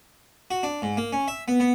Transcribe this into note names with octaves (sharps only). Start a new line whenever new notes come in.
F#4
D4
G#2
A#3
C#4
E5
B3
B3